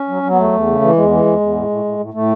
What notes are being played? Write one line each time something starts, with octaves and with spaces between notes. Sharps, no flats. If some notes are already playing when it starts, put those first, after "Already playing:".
Already playing: C#4
F#3
F#3
B3
E2 A3
E2
C#3
E3
E2 G#3
E3
E2
E2
A2
A2
A2
A2
A2 A3